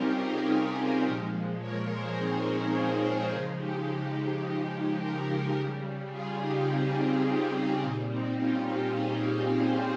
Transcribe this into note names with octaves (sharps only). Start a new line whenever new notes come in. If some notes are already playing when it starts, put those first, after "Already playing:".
Already playing: C3 G3 C4 C#4 D#4 F4 G4 A#4
F4 G#4
G4 A#4
D#4 G4
A#2 F3 G#3 D#4 G4
A#4 C#5
G#4 C5
C4 D#4
C#4
C#4 F4
C4 D#4
C#3 F3 G#3 C#4 F4
D#4 G4
G4 A#4
C#3 G3
F4 G#4
D#4 G4
C4 D#4
C4 D#4
C#4 F4
C#4
A#2 G3 C4 D#4
C4 D#4
C#4 F4
D#4 G4
F4 G#4
G#4 C5